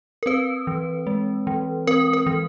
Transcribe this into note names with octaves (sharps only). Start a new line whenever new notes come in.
A#4
C4 B4
E3
G#3
E3
C4 A#4
A#4
E3